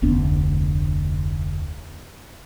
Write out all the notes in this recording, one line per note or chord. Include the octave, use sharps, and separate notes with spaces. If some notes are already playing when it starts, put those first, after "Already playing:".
F1 D2 B3 D4